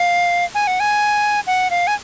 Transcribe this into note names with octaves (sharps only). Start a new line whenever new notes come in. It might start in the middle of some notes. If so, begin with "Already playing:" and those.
Already playing: F5
G#5
F#5
G#5
F#5
F5
G#5